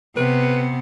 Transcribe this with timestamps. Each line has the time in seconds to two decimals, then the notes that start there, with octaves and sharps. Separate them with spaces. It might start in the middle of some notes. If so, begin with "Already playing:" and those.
0.17 C3 B3 B4